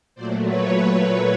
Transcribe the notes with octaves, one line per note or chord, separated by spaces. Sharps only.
A#2 F#3 A3 C5 D5
B4 C#5